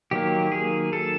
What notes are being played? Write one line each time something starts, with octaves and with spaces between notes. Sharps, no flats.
D#3 F#3 A#3 G4
G#4
A4